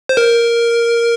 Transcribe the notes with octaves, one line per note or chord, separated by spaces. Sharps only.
C5
A#4